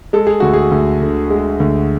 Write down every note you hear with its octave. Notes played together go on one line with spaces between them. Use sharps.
G#3 A4
G#4
D2 F#4
G#4
D2
D3
G#3
D2